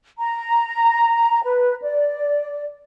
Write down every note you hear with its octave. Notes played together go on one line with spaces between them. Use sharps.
A#5
B4
D5